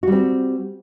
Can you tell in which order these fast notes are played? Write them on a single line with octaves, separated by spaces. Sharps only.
F#4 G3 C4